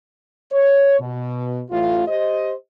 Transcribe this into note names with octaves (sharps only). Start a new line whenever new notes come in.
C#5
B2
A1 A2 F4
G4 C5 D#5